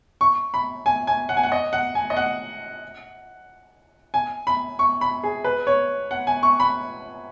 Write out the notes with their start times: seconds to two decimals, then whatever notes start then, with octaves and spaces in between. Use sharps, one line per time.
0.21 C#6
0.54 B5
0.86 G#5
1.07 G#5
1.29 F#5
1.37 G#5
1.43 F#5
1.52 D#5
1.73 F#5
1.95 G#5
2.10 D#5
2.17 F#5
4.14 G#5
4.47 B5
4.79 C#6
5.01 B5
5.23 G#4
5.44 B4
5.67 C#5
6.11 F#5
6.27 G#5
6.43 C#6
6.60 B5